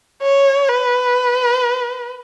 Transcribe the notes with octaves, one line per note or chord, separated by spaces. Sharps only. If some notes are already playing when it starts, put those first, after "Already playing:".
C#5
B4